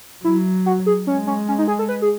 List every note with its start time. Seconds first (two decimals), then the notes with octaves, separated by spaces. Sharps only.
0.24 F#3 E4
0.66 F#4
0.86 G#4
1.07 G#3 C#4
1.27 C#4
1.48 C#4
1.59 D#4
1.68 G#4
1.79 A4
1.89 B4
2.02 G#4